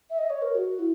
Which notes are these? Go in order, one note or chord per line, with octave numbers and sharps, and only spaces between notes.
E5
D#5
C#5
A#4
F#4
E4